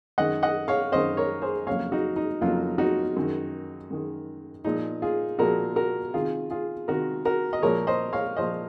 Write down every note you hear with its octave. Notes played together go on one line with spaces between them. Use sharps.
F#2 D#3 G#3 D#5 F#5
D#5 F#5
C#5 F5
F#2 D#3 G#3 C5 D#5
A#4 C#5
G#4 C5
F2 C#3 F#3 A#3 C#5 F5
D#4 F#4
D#4
F2 C#3 F#3 A#3 F4
D#4 F#4
F#2 D#3 G#3
F#2 D#3 G#3
A#2 F3 G#3 D#4
F4 G#4
A#2 F3 G#3 F#4 A#4
F#4 A#4
C3 D#3 G#3 F4 G#4
F4 G#4
C3 D#3 G#3 F#4 A#4
F#4 A#4
D#5
A#2 F3 G#3 A#4 C#5
C5 D#5
C#5 F5
A#2 F3 G#3 C5 D#5